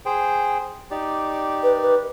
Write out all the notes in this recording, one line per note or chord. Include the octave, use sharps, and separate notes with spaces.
G#4 C5 G5
D#4 G4 D5
B4
B4